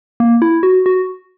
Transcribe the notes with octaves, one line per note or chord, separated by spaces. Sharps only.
A#3
E4
F#4
F#4